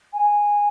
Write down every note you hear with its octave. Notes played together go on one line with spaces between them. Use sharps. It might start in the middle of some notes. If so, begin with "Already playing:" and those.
G#5